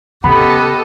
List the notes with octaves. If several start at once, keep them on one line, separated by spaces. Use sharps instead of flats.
C#3 B3 G4 A4 D#5 B5